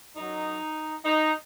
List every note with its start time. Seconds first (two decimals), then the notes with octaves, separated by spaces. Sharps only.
0.17 F#2 F#3 D#4
1.05 D#4